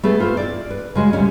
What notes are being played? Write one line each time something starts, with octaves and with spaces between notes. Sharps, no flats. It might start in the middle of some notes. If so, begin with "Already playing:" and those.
A3 B3 G#4 A4
F4 C5
E4 D5
B4
C#3 G#3 F#4
D2 A#2 G3 C#4